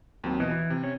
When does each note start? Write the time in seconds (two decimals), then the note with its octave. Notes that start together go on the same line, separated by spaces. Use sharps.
0.24 D#2 F#3 C4
0.40 B2 E3 D#5
0.51 E4
0.70 C3
0.84 C#4